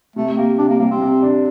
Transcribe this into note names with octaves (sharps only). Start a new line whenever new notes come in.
C3 A3
A#3 G4
C3 D4
A#3
G3 A#3
C4
C3
D4